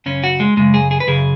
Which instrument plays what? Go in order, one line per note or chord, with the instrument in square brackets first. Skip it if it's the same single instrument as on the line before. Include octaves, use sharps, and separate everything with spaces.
[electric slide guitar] F#2 C#3 C#4
F#4
G#3
F#2 C#3 G#3
G#4
G#4
B4
F#2 C#3 G#4